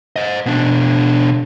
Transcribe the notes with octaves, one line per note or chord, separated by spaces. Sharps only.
C5 D#5
B2 D4